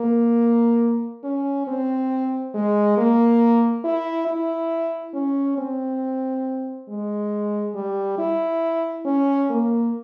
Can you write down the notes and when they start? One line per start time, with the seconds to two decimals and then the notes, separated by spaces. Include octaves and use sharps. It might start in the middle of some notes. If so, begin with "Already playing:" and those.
Already playing: A#3
1.24 C#4
1.68 C4
2.54 G#3
2.97 A#3
3.84 E4
4.28 E4
5.14 C#4
5.58 C4
6.89 G#3
7.75 G3
8.19 E4
9.05 C#4
9.50 A#3